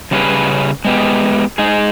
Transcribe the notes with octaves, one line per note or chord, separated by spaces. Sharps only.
C#3 G3 C#4 G#4 B4
G#3 B3 G4
G#3 D#4 G#4